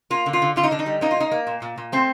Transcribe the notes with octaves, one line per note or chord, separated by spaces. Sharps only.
A#3 F4
D3
F4
D3
D3 F4
D#4
D3 D4
D#4
G3
A#3 D#4
F4
A#3 D#4
A#3
A#2
A#2
A#2
A3 C4